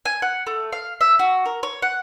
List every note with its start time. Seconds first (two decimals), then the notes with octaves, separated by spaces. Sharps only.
0.05 G#5
0.22 F#5
0.47 A3
0.72 F5
1.01 E5
1.19 F#4
1.46 A#4
1.63 C#5
1.82 F#5